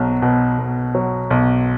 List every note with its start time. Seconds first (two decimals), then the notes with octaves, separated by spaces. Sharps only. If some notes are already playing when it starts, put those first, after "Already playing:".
Already playing: B1 F#3
0.22 B2
0.58 B1
0.95 F#3
1.30 B1